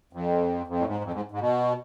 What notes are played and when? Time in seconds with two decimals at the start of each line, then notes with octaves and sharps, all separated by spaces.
0.13 F2
0.67 F2
0.79 A2
0.86 G#2
1.04 F2
1.13 G#2
1.31 G#2
1.40 B2